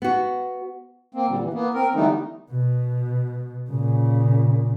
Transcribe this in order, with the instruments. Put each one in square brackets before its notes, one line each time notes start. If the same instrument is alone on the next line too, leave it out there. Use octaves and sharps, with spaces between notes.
[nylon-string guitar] B3 F#4
[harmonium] A#3 C4
A#2 D3 G3
E3
A#3 B3
C4 A#4
D3 E3 G3 A3 B3 D#4
[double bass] B2
A#2 C#3